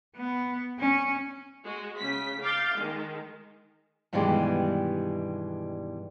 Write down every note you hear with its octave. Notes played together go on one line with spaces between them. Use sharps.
B3
C#4
G#3 F#4
C#3 B6
F5 D6 G6 A6
D#3 G#3
G2 B2 D#3 E3 G3 G#3